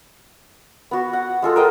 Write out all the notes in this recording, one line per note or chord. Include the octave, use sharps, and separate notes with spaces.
B3 F#4
F#5
G#3 F4 A4
A#4 C5 D#5 G5